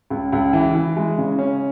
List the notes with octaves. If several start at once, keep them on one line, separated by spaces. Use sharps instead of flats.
C#2
C#2
E3
E3
G#3
C#3
C#4